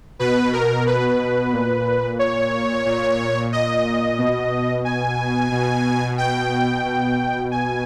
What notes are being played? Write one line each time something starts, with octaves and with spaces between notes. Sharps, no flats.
B2 B4
A#4
B4
A#2
C#5
A#2
D#5
B2
G#5
B2
G5
B2
G#5